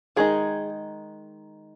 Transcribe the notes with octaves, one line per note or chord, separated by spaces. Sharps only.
D#3 G#3 D#4 G#4